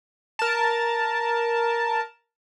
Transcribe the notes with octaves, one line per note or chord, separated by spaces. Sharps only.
A#4 A5